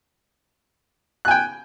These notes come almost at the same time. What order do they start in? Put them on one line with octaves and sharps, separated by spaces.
F#6 G#5 G5